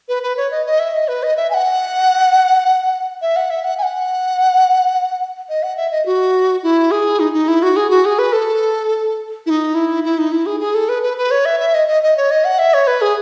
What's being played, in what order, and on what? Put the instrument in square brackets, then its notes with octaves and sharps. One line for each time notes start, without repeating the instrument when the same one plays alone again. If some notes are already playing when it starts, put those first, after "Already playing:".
[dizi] B4
B4
C#5
D#5
D#5
E5
D#5
B4
D#5
E5
G#5
F#5
E5
F#5
E5
F#5
G#5
F#5
D#5
F#5
E5
D#5
F#4
E4
G#4
D#4
D#4
E4
F#4
G#4
F#4
G#4
B4
A4
E4
D#4
E4
E4
D#4
E4
G#4
G#4
A4
B4
B4
B4
C#5
E5
E5
D#5
D#5
D#5
C#5
D#5
F#5
E5
C#5
B4
G#4